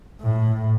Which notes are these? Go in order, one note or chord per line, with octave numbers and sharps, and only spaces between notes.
A2